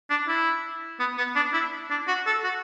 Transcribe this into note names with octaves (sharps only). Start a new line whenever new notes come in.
D4
E4
B3
B3
D4
E4
D4
F#4
A4
F#4